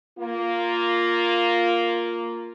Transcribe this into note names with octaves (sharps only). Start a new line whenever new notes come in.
A#3 F4